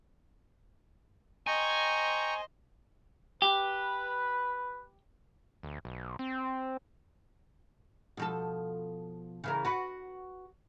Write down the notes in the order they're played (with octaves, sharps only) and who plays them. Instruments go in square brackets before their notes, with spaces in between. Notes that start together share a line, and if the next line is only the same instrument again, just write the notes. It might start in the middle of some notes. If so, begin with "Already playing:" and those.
[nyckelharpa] C5 D#5 [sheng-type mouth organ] G5 A#5 C#6 [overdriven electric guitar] G#5
[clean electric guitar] G4 [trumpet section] B4
[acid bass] D2
B1
C4
[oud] B2 F3 A4
C#3 E3 A#4
F#4 B4